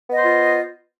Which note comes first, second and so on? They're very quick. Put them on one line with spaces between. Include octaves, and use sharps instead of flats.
B3 D#5 C5 F4